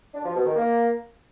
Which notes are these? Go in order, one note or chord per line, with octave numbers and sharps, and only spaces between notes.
D4
F3
B2
D#3
A#3